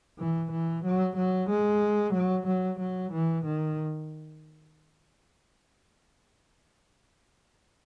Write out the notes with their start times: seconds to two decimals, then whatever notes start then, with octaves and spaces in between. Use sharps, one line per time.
0.19 E3
0.52 E3
0.84 F#3
1.17 F#3
1.49 G#3
2.14 F#3
2.47 F#3
2.79 F#3
3.12 E3
3.45 D#3